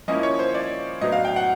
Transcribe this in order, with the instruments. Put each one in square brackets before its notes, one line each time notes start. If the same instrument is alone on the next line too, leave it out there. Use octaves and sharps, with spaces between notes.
[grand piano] F3 A#3 C#4 E4 D#5
C#5
C5
D5
A2 F#3 B3 D4 D#5
F5
G5
F#5